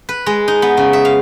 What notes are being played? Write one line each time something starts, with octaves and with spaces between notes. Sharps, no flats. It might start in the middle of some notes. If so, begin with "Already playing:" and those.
B4
G#3
D#4
B3
C#3
E5
F5